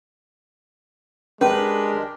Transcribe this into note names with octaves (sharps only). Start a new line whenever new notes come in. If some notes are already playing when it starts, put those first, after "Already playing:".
G#3 C#4 D4 G4 A#4 B4